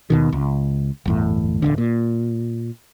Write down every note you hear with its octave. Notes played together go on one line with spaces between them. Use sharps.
D#2 B2 D#3
C#2
G1 E2 A2
D1 G1 D3
A#2